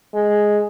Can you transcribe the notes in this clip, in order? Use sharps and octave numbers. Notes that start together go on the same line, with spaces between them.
G#3